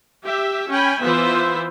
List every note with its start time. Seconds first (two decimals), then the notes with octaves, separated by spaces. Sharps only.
0.24 G4 E5
0.70 C#4 G5 G#5 B5
1.01 E3 B3 F4 B4 C5 E5